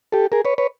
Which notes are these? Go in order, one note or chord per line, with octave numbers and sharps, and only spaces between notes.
G4 A4
G#4 A#4
B4 C#5
B4 C#5